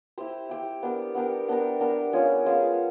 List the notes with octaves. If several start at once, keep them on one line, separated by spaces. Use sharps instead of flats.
E4 G4 C5
E4 G4 C5
B3 D4 G4 A#4
B3 D4 G4 A#4
B3 D4 G4 A#4
B3 D4 G4 A#4
G#3 C#4 F4 G#4
G#3 C#4 F4 G#4